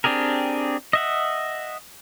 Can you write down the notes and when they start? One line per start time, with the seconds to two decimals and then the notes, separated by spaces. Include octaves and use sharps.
0.04 C4 D4 G4 G#4 A#4
0.93 D#5 E5 F#5